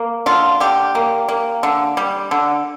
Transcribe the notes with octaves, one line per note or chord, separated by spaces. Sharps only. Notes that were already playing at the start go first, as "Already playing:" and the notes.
Already playing: A#3
D3 F4
D3 G4
A#3
A#3
D3
G3
D3